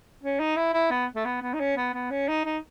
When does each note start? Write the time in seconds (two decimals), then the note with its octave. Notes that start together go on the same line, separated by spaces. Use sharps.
0.23 C#4
0.40 D#4
0.57 E4
0.74 E4
0.91 B3
1.16 A3
1.25 B3
1.42 B3
1.54 D#4
1.60 C#4
1.77 B3
1.94 B3
2.11 C#4
2.28 D#4
2.45 D#4